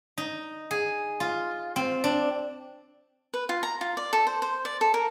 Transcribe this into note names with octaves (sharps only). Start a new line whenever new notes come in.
D#4
G#4
F4
C4
D4
B4
F4
A#5
F4
D5
A4
C5
C5
D5
A4
A#4